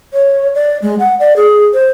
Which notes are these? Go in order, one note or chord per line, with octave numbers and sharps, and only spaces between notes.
C#5
D5
G#3
F#5
D5
G#4
C5